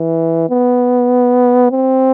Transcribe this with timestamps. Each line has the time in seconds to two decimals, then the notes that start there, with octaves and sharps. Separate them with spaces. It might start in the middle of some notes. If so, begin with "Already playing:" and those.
Already playing: E3
0.50 B3
1.71 C4